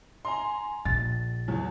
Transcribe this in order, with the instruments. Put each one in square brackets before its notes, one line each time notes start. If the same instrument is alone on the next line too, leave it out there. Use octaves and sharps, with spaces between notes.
[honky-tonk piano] G#5 A#5 C6
[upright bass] A#1 [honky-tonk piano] A6
[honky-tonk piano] E2 F#3